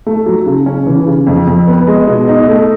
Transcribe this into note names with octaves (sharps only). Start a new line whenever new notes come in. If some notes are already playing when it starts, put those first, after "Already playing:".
A3
F#3
C#3
C#4
E3
C#3
F2
F2
B3
G#3
B2
D#4
A3